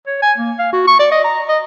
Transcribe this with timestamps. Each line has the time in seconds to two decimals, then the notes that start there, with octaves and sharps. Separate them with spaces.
0.07 C#5
0.22 G#5
0.38 A#3
0.59 F5
0.73 F#4
0.87 C#6
0.99 D5
1.12 D#5
1.24 A#5
1.49 D#5